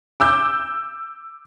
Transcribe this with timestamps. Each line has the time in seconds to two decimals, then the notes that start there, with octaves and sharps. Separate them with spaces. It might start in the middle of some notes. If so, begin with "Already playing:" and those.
0.20 D6 E6 G6